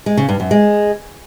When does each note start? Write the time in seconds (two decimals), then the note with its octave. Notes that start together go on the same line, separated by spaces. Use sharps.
0.06 G#3
0.17 C#3
0.29 G2
0.40 F#2
0.51 G#3